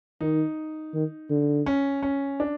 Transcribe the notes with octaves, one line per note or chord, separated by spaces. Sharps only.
D#3 D#4
D#3
D3
C#4
C#4
D4